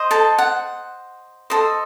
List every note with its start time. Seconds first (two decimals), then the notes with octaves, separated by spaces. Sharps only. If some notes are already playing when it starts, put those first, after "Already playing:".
Already playing: C5 D#5
0.11 A4 A5
0.38 F#5
1.50 A4 C5 D#5